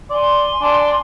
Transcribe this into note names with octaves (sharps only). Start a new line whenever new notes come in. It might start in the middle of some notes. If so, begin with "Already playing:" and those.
D5 G#5 C6
D4